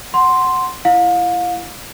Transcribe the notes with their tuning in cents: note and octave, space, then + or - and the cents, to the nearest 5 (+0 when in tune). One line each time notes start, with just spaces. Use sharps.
F#5 +0 C6 +0
E4 +25 F5 +35